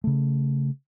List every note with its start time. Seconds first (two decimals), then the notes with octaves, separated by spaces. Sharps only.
0.04 C#3 A3